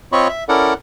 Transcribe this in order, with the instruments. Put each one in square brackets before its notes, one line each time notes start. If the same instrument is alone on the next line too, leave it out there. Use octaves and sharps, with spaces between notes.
[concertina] C4 F4 C#5 D#5 B5 C#6
E5
C#4 E4 A4 A#4 D5 F#5